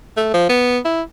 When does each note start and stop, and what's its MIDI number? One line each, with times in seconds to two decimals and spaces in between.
0.17 0.29 57
0.34 0.46 53
0.49 0.79 59
0.85 1.02 64